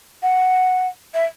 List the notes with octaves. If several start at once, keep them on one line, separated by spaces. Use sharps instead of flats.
F#5
E5